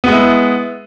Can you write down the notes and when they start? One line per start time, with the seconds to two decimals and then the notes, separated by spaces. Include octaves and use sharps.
0.04 B3
0.08 G#3
0.11 E4